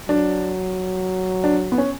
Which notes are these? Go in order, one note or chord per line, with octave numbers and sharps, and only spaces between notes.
F#3 D4
D4
B3
C#4